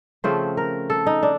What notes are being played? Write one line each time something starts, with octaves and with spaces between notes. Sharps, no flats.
C#3 F3 A3 C4 C5
A#4
A4
D#4
D4